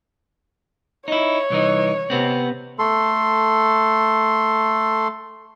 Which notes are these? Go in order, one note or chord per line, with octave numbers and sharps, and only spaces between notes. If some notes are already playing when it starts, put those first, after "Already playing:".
D#4 E4 C#5
C2 E3 D#4
C3 B3 C4
A3 A4 C6